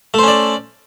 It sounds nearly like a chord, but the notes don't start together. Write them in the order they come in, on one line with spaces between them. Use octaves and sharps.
A3 C5 C#4 D5